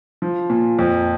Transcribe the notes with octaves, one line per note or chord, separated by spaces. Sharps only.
F3
A#2
F2